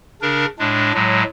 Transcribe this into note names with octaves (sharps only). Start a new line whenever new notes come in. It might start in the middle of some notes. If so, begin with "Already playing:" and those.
C#3 D4 A#4
A2 G#3 D4
A2 F#3 G#3